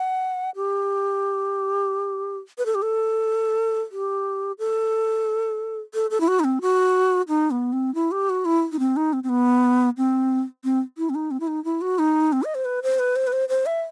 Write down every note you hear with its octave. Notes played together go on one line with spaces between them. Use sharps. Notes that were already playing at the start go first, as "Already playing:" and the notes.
Already playing: F#5
G4
B4
A4
G4
A4
G4
A4
A4
A4
E4
F#4
D#4
C4
F#4
D#4
B3
C4
E4
G4
F#4
E4
D#4
C4
D#4
C4
C4
B3
C4
C4
E4
C4
D#4
C4
E4
D#4
E4
F#4
D#4
C4
D#5
C5
B4
C5
B4
C5
B4
C5
C5
E5